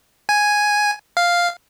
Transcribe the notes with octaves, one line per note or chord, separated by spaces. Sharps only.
G#5
F5